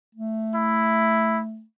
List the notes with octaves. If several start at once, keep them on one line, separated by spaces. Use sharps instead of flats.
A3
E4